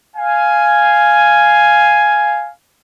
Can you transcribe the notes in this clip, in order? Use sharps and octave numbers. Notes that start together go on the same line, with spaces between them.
F5 G#5